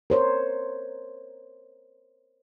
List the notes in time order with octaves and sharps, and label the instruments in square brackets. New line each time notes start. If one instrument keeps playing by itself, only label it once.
[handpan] A#4 C5 C#5